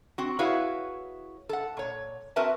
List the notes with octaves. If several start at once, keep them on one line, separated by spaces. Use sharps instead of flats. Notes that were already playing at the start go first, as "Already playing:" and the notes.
C4 F#4
E4 F#4 G#4 B4 C#5 F5
A4 F#5
A#2 C#5
C4 F#4 A#4 B4 E5 A5